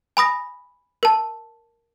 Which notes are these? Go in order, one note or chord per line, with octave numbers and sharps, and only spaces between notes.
G#5 B5 D#6 A#6
A#4 A5